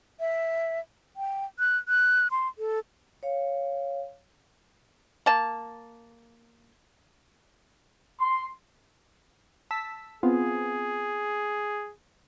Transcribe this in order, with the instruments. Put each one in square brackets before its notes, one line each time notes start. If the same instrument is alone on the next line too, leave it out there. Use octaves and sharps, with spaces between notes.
[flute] E5
G5
F#6
F#6
C6
A4
[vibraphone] C#5 F5
[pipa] A#3 A5
[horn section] C6
[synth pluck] A5 E6 B6
[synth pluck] B3 C4 F4 [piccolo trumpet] G#4